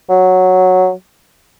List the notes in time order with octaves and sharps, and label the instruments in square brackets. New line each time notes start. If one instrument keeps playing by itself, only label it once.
[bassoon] F#3